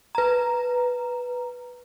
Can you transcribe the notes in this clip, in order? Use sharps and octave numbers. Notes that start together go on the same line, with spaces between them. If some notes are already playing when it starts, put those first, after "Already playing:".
B4 A#5